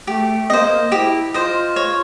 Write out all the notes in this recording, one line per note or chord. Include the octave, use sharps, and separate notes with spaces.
A3 G4
A#3 C4 C5 D#5
E4 G4
F4 C5 D#5
C#5